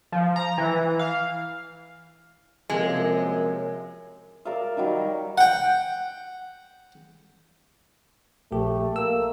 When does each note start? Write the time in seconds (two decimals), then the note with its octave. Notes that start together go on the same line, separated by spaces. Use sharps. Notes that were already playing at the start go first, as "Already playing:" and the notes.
0.12 F3
0.36 A#5
0.58 E3
0.99 F5
2.70 C3 F3 G#3 A#3
2.86 F#2
4.45 A#4 D5 E5 F5
4.77 D#3 F#3 G3
5.38 F#5 G5
8.52 A#1 A3 G4
8.96 A#3 E6